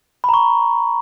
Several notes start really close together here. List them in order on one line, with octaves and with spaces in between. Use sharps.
B5 A#5 C#6